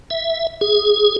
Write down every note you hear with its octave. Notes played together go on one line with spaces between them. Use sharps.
E5
G#4